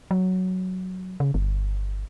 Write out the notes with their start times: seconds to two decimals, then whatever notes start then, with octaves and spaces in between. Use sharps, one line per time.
0.11 F#3
1.20 C#3
1.34 G1